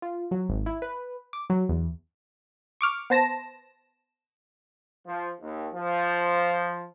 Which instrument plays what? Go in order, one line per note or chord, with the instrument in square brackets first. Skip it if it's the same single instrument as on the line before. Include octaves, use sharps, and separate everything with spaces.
[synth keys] F4
F#3
G#1
E4
B4
D6
F#3
E2
[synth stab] C#6 D6 F6
B3 C5 A5 A#6 E7
[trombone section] F3
D#2
F3